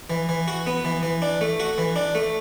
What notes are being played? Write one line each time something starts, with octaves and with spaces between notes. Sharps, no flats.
E3
E3
F#4
B3
E3
E3
D4
A3
F#4
E3
D4
A3